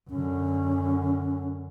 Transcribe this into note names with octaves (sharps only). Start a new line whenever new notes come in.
F#2 D3 C#4